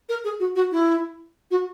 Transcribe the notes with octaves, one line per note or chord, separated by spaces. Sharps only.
A#4
G#4
F#4
F#4
E4
F#4